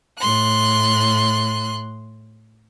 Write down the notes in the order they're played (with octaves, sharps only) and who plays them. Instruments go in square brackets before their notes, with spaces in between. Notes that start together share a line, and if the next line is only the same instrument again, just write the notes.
[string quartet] A2 C6 F#6